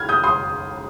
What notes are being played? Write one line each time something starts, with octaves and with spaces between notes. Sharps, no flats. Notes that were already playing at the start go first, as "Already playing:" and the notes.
Already playing: F6 G#6
D#6 G6
C6 D#6